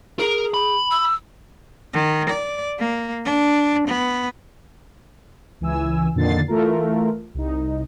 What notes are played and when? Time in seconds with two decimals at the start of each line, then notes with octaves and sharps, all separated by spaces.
0.19 G#4 A#4
0.54 B5
0.91 E6
1.93 D#3
2.29 D5
2.79 A#3
3.25 D4
3.88 B3
5.61 C#2 E3 G#5 E6
6.15 F2 A#2 D3 D#3 A6 C7
6.48 E3 A3 F4 A#4
7.34 C2 D#4